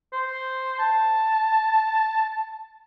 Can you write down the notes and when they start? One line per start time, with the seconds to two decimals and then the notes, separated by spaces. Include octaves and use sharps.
0.12 C5
0.79 A5